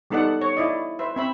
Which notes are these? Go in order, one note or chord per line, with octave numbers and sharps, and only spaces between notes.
G3 B3 D#4 A4 D5 F#5
C#5
E4 D5 D#5
B4 C5 E5
C4 E5 B5